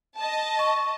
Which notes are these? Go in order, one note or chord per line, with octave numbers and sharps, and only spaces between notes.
D#5 A5
C#6